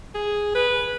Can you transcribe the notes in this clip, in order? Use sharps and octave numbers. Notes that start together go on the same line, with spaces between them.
G#4
B4